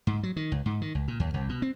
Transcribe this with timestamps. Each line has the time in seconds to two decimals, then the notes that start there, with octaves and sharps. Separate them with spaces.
0.07 G#2
0.23 F#3
0.36 D#3
0.52 C#2
0.66 G#2
0.82 D#3
0.95 C#2
1.08 A#2
1.20 D#2
1.34 C2
1.49 B2
1.62 C4